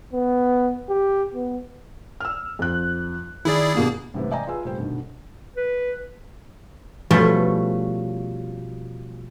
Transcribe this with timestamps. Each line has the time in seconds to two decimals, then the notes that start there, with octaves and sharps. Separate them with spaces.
0.13 B3
0.89 G4
1.34 B3
2.20 E6 F6
2.59 F2 F#6
3.45 D#3 E4 G#4 D5
3.75 G2 B2 A#3 G#4
4.14 A1 G#2 C3 E3 B4
4.31 D5 D#5 G5 G#5 A#5
4.47 F4 G#4 B4 G#5 E6
4.64 F1 A#2 G3 C5 G5
4.78 G2 B2 D3 D#3
5.56 B4
7.11 B2 F3 G3 A3 C#4